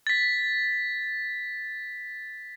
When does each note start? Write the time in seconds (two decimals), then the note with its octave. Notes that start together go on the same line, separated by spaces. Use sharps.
0.07 A6 B6